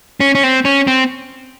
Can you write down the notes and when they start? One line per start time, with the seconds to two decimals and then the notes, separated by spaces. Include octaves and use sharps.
0.20 C#4
0.35 C#4
0.43 C4
0.65 C#4
0.87 C4